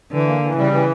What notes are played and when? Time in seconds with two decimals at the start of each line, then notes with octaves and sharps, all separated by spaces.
0.12 D3 E3
0.27 A#3
0.42 E3
0.58 C#3 G3
0.73 E3